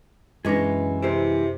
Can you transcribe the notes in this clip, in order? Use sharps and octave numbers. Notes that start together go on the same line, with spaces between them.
B1 F#2 E3 G#3 C#4 D4 G#4 A#6
C3 E4 A#4 C5